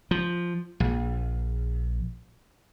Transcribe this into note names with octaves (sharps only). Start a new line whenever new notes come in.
F3
A#1